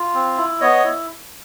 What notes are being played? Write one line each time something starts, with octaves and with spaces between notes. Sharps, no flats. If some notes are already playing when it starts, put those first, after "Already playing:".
Already playing: F4
C4
E4
B3 C#5 D#5
E4